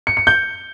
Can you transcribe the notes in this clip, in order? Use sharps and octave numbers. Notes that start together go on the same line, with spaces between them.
C#7
C#7
G6